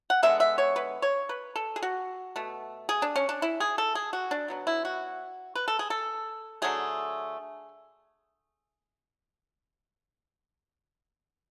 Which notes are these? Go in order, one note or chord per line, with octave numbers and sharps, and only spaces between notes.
F#5
D3 G#3 B3 E5
E5
C#5
B4
C#5
B4
A4
G#4
F#4
B2 A3
G#4
D4
C#4
D4
E4
G#4
A4
G#4
F#4
D4
B2 F#3 B3
E4
F#4
B4
A4
G#4
A4
D3 F#3 A3 G#4